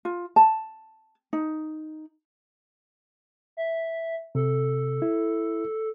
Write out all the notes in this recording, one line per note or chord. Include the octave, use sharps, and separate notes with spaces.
F4
A5
D#4
E5
C3 A4
E4